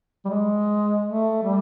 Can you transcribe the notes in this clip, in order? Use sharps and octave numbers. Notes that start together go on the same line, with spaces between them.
G3
G#3
A3
G3